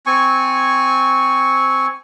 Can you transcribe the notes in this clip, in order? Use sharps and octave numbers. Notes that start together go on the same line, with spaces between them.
C4 G#5 C#6